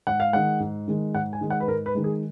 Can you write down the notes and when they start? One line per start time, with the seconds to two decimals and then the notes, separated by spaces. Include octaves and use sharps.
0.07 G#2 F#5
0.20 F5
0.33 D#3 G#3 F#5
0.60 G#2
0.88 D#3 G#3
1.14 G#2 F#5
1.33 G#5
1.41 D#3 G#3
1.50 F#5
1.60 B4
1.68 G#2 A#4
1.86 B4
1.95 D#3 G#3
2.04 G#4